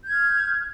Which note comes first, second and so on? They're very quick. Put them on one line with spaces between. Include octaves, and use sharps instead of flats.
G6 G#6 F6